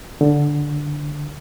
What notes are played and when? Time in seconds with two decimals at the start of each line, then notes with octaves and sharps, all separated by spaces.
0.21 D3